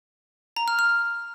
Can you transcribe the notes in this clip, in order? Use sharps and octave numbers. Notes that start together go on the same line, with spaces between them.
A#5
F6
F6